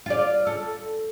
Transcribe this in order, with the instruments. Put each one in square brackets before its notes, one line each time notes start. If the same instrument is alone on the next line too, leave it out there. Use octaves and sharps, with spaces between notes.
[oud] F4 D5
A4